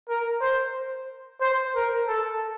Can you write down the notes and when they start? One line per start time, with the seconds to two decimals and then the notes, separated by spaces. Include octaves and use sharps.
0.09 A#4
0.41 C5
1.41 C5
1.75 A#4
2.08 A4